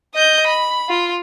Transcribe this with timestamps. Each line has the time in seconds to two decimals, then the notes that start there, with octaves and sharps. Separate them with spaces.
0.15 D#5 G6
0.47 B5
0.89 F4